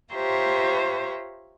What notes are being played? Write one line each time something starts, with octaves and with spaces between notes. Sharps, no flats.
F4 G4 C5 C#5 E5 A#5